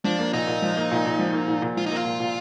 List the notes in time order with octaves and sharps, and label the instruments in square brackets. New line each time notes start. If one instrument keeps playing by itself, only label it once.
[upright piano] F3 [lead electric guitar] D4
[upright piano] A#3
[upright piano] A#2 [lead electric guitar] D#4
[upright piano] A#2
F3
A#3
A#2
A#2
F3
A#3
A#2
A#2
[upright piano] F3 [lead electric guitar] F4
[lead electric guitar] D#4
[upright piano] A#3 [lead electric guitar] F4
[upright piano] A#2
A#2